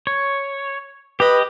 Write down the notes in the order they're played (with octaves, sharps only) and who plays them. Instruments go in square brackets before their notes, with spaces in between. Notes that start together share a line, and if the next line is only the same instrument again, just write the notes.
[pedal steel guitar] C#5
[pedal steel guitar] G4 D#5 [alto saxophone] B4